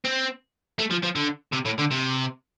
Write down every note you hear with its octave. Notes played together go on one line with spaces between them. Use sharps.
C4
A3
F3
F3
D3
C3
A2
D3
C3